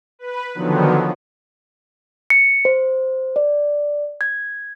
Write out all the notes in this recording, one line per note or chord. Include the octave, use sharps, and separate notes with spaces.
B4
D3 D#3 F3 F#3 B3
C#7
C5
D5
G#6